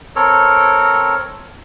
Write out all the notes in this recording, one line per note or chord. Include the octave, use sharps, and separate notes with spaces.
C4 A4 A#4 C#5